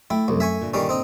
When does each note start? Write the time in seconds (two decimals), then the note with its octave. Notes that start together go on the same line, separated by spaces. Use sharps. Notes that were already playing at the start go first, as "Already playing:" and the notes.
0.10 A3 E4 G5
0.28 C2 F#2 A3 A4
0.40 E5 G#5 C#6
0.61 G2 A#2 D3
0.74 D#3 G3 C#4
0.89 C4 D#4